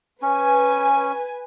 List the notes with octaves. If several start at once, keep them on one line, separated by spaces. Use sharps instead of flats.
C#4 B4 G#5